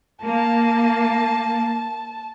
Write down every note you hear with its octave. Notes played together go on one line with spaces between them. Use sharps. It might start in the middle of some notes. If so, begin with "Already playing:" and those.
A#3 A5